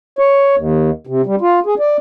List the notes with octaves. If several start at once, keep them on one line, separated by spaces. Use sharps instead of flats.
C#5
D#2
C3
G3
F4
G#4
D5